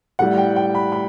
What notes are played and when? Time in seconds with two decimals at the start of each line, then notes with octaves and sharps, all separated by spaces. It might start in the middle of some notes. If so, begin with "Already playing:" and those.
0.19 A2 G3 F#5
0.38 G5
0.56 G5
0.75 B5
0.92 B5